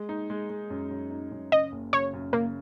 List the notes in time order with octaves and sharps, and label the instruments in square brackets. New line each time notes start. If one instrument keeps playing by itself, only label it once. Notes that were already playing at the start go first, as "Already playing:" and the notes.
Already playing: [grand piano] G#3
D#4
G#3
G#3
F#2
F#2
D#4
F#2
[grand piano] C#3 [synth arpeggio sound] D#5
[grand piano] F#1
[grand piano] C#3 [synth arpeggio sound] C#5
[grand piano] F#2
[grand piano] C#3 [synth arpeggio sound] A#3